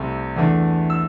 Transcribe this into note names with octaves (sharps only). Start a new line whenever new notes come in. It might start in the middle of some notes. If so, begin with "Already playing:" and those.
Already playing: C2 C3 A3 C4
E2 E3 A3 D4
E6